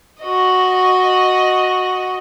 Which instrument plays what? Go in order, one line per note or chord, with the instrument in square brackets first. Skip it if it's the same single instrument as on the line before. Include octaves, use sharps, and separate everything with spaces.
[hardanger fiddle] F#4 D#5